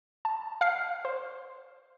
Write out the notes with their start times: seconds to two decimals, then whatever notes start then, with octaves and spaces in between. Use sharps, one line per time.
0.25 A5
0.61 F5 F6 C7
1.05 C5